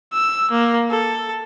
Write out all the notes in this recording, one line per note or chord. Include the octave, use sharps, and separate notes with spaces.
E6
A#3
A4